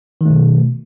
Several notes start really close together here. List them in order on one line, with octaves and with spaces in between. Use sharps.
D#3 A3 B2